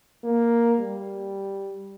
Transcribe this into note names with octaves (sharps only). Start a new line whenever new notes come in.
A#3
G3